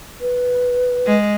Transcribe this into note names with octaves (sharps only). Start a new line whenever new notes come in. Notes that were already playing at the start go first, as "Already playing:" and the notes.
B4
G#3